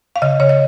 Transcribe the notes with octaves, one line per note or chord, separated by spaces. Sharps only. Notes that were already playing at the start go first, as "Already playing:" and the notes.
F5
C#3 D#5
C#3 C#5
D#5